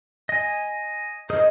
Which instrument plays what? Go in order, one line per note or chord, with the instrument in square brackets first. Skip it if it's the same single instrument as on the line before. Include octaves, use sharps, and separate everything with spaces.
[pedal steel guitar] D#5 G#5
[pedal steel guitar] G#4 A#4 C5 [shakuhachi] D#5